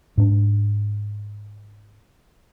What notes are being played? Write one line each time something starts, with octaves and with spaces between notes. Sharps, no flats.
G#2 D4